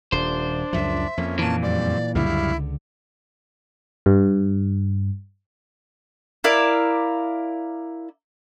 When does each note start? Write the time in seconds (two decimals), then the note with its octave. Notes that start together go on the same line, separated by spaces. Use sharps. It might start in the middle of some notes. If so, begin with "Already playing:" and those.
0.12 D#1 D4 C5
0.73 C#2 F#2 F3 E5
1.18 F2 F3 A#3 C#4
1.39 A#2 E3 A5
1.63 F#2 G3 C4 D5
2.15 C#2 F#2 D3 G3 E4 F5
4.06 G2
6.44 E4 A#4 D5 F5